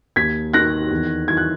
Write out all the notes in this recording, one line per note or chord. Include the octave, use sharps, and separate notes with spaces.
D#2 G#6 B6
D#3 F#6 A#6
E2
E3 G#6
F#6